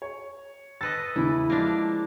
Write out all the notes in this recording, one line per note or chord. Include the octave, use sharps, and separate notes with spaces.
C#5
A4 B4 D#5 A6
E2 C#3 E4
F3 G#3 A#3 D4